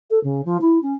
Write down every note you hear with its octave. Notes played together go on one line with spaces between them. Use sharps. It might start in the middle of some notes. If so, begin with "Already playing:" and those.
A4
C#3
F3
E4
C#4